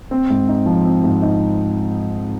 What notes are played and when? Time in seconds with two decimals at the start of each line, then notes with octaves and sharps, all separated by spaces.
0.11 C4
0.30 G#2
0.48 D#4
0.66 F3
0.85 C4
1.04 G#2
1.22 D#4